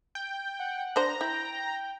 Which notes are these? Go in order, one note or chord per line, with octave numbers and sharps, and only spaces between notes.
G5
F#5
D4 C5 A#5
E4 G5